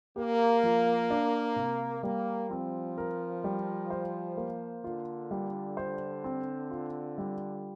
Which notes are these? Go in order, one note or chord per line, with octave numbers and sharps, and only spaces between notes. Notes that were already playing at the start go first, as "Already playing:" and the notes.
A#3 G4
F3
D4
C3
G3 A#3
F3 C4
A#4
G3
C5
A#3
D3 F4
G3
C5
C4
F4
G3